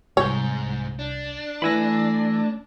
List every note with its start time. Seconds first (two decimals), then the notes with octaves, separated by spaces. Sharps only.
0.17 C2 G#2 C#5 G6
0.99 D4
1.62 E3 A3 G#5 B5 E6 A#6